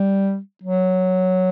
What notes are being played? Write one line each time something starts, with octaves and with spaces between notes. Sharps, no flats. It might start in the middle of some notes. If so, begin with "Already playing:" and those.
Already playing: G3
F#3